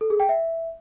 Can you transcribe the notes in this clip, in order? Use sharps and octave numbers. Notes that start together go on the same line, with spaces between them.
A4
G#4
G5
E5